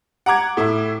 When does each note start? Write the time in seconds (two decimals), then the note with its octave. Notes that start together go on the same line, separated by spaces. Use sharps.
0.26 F#5 A#5 D6 G#6
0.57 A2 E4